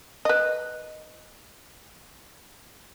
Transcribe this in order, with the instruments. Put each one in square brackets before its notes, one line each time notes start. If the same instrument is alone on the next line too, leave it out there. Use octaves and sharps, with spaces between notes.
[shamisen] B4 D#5